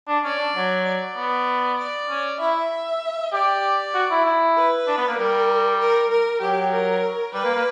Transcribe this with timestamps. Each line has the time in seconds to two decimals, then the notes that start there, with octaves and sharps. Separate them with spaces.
0.08 D4
0.24 C#4 D5
0.39 D4
0.55 F#3
0.86 D5
1.17 B3
1.78 D5
2.10 C#4
2.40 E4 E5
3.33 G4 D5
3.94 F#4
4.11 E4
4.25 E4
4.57 B4
4.88 D4
4.97 B3
5.08 A#3
5.18 G3 A#4
5.80 A#4
6.11 A#4
6.41 F#3 G4
6.72 A#4
7.34 G3 B4
7.45 A#3
7.55 A#3